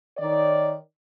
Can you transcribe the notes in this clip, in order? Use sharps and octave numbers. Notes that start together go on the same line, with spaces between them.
D#3 C#5 D5